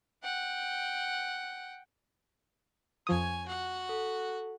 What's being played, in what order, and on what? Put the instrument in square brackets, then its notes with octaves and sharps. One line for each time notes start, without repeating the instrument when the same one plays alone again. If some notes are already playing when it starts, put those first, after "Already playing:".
[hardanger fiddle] F#5 G5
[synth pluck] F2 F3 D#6 [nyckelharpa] C#5 G#5
[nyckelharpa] F#4 F#5
[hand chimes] A4